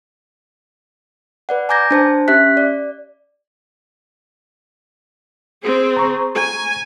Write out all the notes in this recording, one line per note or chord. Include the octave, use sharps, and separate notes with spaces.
B4 D5 F#5
G#5 A#5 D6 G6 G#6 A#6
D4 C5 A5
C#4 G4 E5 F#6 B6
D5
C4 G#4
A#5 C#6
G#5